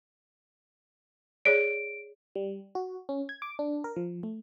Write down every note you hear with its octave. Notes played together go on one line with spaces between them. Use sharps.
G#4 C#5 D5 D7
G3
F#4
C#4
G#6
D6
D4
A#4
F3
A3